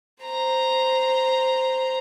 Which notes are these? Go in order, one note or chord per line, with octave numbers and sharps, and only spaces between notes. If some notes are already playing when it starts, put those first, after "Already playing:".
C5 A#5